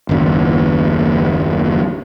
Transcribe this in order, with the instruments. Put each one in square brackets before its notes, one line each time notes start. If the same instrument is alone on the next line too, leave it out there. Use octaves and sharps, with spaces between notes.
[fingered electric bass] F#1 D#2